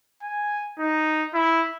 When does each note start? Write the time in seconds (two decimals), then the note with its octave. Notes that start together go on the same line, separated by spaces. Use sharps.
0.23 G#5
0.79 D#4
1.34 E4